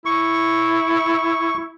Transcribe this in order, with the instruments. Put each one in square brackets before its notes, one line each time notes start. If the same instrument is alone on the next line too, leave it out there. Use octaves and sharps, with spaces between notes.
[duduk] E4 [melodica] C#6